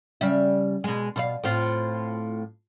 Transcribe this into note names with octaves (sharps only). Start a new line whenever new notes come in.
C#3 G3 E5
B2 G#3
B2 C5 F5
A2 C4 F4